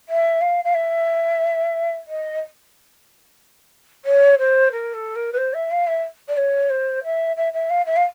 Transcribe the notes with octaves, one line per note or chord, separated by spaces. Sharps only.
E5
F5
F5
E5
D#5
C#5
C5
A#4
A4
A#4
B4
C5
E5
F5
E5
D5
C#5
C5
E5
E5
E5
F5
E5
F5